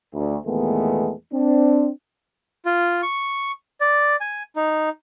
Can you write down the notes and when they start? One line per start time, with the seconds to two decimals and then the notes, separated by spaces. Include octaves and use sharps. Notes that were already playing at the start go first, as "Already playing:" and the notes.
0.14 D2
0.46 E2 A#2 D#3 G#3 A3 B3
1.33 C4 D4
2.65 F4
3.03 C#6
3.80 D5
4.21 G#5
4.56 D#4